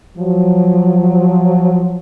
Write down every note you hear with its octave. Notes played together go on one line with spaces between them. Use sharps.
F3 F#3